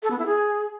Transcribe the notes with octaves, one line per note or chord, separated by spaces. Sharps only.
A4
B3
E4
G#4